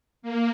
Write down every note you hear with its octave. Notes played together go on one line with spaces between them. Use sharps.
A#3